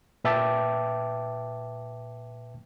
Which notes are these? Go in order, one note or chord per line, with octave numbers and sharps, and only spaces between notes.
A#2 B4 E5 G5 A5 D6